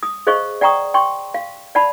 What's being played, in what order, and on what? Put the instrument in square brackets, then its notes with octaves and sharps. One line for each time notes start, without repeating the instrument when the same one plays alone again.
[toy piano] D#6
G#4 C5 D#5 F5 C#6
D5 F#5 G5 A#5 C#6 D#6
G5 C6 C#6
F5
D5 F#5 A5 B5